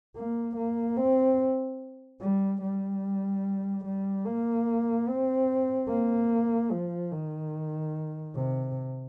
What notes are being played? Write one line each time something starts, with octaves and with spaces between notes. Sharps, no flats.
A#3
A#3
C4
G3
G3
G3
A#3
C4
A#3
F3
D#3
C3